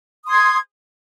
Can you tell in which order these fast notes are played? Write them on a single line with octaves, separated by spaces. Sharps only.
D#6 C6 G#6